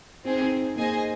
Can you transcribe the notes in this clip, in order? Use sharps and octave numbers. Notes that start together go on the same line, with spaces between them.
C4 D#4 G#4 C5 G#5
D#4
A#3 G#4 C5 D#5 G#5